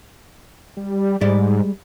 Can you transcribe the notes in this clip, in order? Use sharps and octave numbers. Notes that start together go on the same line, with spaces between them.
G3
G#2 G3 G#3 D5